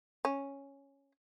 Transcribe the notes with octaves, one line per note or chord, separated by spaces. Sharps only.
C#4